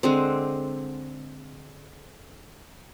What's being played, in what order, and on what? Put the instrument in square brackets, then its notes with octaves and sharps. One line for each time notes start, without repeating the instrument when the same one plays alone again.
[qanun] D3 G#3 C4